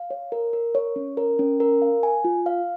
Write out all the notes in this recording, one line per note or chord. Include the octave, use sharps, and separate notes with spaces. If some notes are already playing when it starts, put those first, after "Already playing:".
Already playing: F5
C#5
A#4
A#4
C#5
C#4
A#4
C#4
A#4
F5
G#5
F4
F5